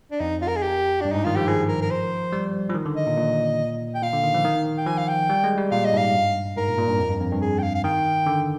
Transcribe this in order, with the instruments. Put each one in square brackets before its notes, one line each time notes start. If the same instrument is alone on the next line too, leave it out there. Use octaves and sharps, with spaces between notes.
[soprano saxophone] D4
[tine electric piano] F2 [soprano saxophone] D#4
[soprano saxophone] F4
A#4
G#4
G4
[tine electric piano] G2 [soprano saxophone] D4
[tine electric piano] G#2 [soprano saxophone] D#4
[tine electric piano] D#3 [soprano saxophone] F4
[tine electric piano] F3 [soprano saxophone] G4
[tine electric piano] F3 [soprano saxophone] G#4
[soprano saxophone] A#4
A#4
C5
[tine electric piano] G3
F3
D#3
D3
[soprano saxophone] D#5
[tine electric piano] A#2
A#2
[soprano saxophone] G5
[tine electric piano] A#2 [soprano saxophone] F5
[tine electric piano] D3
D#3
F3
D#3
[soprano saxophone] G5
[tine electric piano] F3 [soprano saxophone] G#5
[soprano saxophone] F5
G5
[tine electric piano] G3
G#3
G3
[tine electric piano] A#2 [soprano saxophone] F5
[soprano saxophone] D#5
[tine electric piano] G#2 [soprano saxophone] F5
[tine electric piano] G2
[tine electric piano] G#2 [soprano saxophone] A#4
[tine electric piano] A#2
A#2
G2
F2
G2
F2
G2
[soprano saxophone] G#4
G5
F5
F5
[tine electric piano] D#3 [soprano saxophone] G5
[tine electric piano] D3